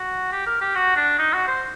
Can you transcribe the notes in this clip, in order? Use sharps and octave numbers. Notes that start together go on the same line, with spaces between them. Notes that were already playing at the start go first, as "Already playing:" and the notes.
Already playing: F#4
G4
A#4
G4
F#4
D4
D#4
F#4
C5